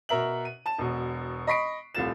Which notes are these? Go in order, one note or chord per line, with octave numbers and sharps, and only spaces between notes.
B2 A#4 E5 F#7
D#7
A5 E7
E1 B2
D#5 B5 C#6 B6 C7 D7
D#1 C2 A3 F4 A6 E7